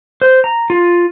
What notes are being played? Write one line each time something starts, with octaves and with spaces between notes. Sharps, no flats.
C5
A#5
F4